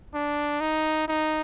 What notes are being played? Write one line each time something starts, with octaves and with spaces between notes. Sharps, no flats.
D4
D#4
D#4